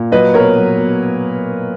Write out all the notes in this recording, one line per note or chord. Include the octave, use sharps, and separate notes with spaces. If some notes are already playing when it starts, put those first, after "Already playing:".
Already playing: A#2
F#3 B4 D#5
B2 A#4 C#5
F#3
B2